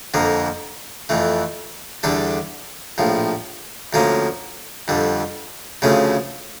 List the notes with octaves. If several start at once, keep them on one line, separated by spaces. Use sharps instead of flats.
F2 D3 F3 A#3
F2 E3 A3
E2 D3 G3 D4 A4
A#1 A2 F3
D2 D3 F3 A#3 C#4
F2 D3 G3
D2 C#3 F3 A3 C#4